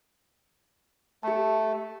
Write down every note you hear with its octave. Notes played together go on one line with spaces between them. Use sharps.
A3 G4 A5